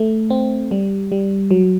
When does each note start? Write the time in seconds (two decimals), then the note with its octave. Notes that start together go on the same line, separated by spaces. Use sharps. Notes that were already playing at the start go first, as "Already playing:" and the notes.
Already playing: A3
0.30 C4
0.71 G3
1.12 G3
1.51 F#3